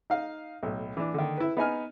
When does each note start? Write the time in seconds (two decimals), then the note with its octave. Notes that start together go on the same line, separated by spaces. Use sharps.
0.10 D#4 F5
0.63 B1 A2
0.97 E3 D4
1.14 D3 D#3
1.37 E4 B4
1.57 B3 D#4 G#5 F6